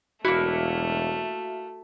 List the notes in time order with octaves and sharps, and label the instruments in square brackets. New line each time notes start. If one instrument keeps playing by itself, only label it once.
[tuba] E1 [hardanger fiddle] A3 [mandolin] A#3 E4 [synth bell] F#4